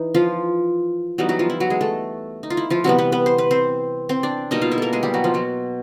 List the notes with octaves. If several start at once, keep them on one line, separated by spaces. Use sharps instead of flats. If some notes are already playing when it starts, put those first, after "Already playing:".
Already playing: E3 D#4
F3 F4
E3 F#3 G3 B3 D#4 F#4
F#3 F#4
F3 F4
E4
F#3 F#4
G#3 G#4
A3 A4
D#4
F4
E4
F3 F4
C3 E3 F#3 G3 B3 F#4
B3 B4
B3 B4
C5
B4
C4 C5
C4 C5
D4 D5
B2 G3 A#3 D#4 D#5
F4 F5
E4 E5
A#3 A4 A#4
G#3 G#4
G3 G4
F#3 F#4
F3 F4
F#3 F#4